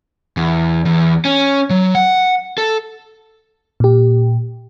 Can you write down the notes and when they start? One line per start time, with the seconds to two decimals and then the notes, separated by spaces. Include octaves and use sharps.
0.37 E2
0.85 E2
1.25 C#4
1.70 F#3
1.95 F#5
2.58 A4
3.80 A#2 G4